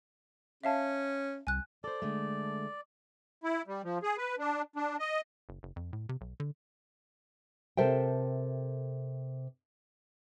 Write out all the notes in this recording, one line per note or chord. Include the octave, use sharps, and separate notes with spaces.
C#4 E5 F5 A5
C2 G#5 F#6
A4 C5 D5
D3 G#3 A3
E4
G3
F3
G#4
B4
D4
D4
D#5
F#1
F#1
F2
A2
C3
B1
D3
C3 A4 A#4 C5 E5 G5